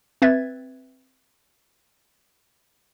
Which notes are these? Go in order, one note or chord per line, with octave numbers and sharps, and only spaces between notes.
C4 B4 E5 G#6 A6